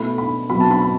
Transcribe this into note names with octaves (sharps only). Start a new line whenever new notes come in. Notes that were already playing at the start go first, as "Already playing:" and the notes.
Already playing: B2 A3 E4 B5
B5
B2 F#3 C4 E4 B5
A5
B5
B5